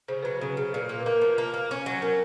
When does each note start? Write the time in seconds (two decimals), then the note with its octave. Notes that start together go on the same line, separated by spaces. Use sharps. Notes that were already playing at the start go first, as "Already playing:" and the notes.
0.08 C#3 C5
0.23 F#3 B4
0.37 C#3 C5
0.57 C#3
0.73 A#2 B4
0.89 A#3
1.00 B4
1.06 A#3 A#4
1.17 F3 A#4
1.28 B4
1.38 A#3
1.54 A#3
1.71 C#4
1.86 F#3
2.02 C#4 A#4